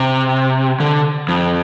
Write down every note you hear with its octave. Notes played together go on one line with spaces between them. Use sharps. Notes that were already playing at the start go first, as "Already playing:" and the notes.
Already playing: C3
D3
F2